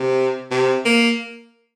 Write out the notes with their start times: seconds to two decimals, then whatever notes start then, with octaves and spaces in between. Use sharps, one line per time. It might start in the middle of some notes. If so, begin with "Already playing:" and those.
Already playing: C3
0.51 C3
0.85 A#3